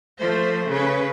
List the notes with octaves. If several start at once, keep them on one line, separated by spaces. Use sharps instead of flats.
F3 A3 C5
C#3 B4